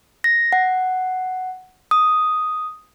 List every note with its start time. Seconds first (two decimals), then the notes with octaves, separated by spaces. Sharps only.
0.24 A#6
0.53 F#5
1.91 D#6